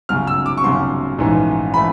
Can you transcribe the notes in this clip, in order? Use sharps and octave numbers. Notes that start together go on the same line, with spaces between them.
G1 F#2 C#3 F6
E6
D6
C#6
G1 F#2 C#3 C6
A#1 G#2 E3 A3 C#4
E3 A3 B5